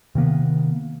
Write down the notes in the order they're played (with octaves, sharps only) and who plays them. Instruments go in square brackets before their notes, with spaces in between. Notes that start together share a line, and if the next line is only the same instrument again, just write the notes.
[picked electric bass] C3 D#3 A#3 B3